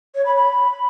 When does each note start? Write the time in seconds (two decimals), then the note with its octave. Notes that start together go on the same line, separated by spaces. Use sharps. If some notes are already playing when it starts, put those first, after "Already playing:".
0.15 C#5
0.26 B5
0.36 B5